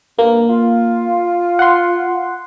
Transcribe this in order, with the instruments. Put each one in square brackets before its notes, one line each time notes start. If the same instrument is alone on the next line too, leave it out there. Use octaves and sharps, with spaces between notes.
[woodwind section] G2 [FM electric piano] A#3
[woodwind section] F4
[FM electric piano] F#5 C6